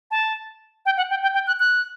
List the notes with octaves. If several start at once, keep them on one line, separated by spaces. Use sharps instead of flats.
A5
G5
F#5
G5
G5
G5
F#6
F#6